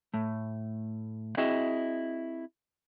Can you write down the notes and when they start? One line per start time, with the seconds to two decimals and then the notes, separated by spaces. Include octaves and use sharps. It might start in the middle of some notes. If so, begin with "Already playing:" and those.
0.14 A2 A3
1.37 C4 E4 F#4 G#4 D#5 A5